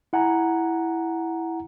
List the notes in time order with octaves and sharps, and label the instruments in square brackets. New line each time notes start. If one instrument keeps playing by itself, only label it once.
[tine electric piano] E4 F#5 G#5 A#5